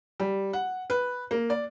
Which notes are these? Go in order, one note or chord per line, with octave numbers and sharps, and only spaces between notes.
G3
F#5
B4
A#3
D5